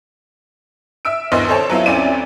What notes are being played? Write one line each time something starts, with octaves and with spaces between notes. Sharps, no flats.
E5 E6 D7
A#1 D#2 E3 B3 D#5 C6
A4 C5 C#5 A5
F#3 B3 E4 F4
D2 C4 C#4 E4 D5 D#7